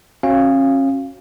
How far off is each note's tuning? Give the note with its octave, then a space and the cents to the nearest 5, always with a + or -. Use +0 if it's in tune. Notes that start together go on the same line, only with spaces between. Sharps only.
C#4 -35 F#4 -15 F5 -10